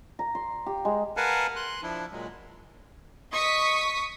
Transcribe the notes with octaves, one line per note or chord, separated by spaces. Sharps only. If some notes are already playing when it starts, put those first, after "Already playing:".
A#5
C6
G4
G#3
A#4 B4 F5 F#5 G#5 A5
C6 F#6
F3 D4 E4
A#2 F#3 G#3
D#5 C#6 D#6 B6